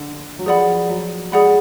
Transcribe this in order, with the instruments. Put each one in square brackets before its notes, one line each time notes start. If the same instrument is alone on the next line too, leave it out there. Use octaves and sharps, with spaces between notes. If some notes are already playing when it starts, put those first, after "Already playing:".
Already playing: [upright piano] D3
F#3
[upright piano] F3 [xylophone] G#4 D5 F#5 B5
[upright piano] F#3
[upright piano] G#3 [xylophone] G#4 D5 F#5 B5